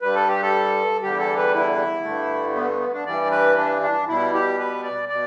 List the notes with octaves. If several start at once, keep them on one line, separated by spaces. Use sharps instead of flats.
G2 G3 B4
A4
G4
A4
E2 D3 G3 G4
A4
B4
E4
G2 D3 A3
B3
B3
D4
G2 E3 G3 D5
B4
D4
D4
B2 G3 E4
G4
B4
D5
B2 D5